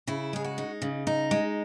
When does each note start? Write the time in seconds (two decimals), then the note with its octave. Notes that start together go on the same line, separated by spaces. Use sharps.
0.07 C#3 E4
0.33 G#3 G#4
0.44 F#4
0.58 D#4
0.82 C#3
1.07 D#4
1.31 G#3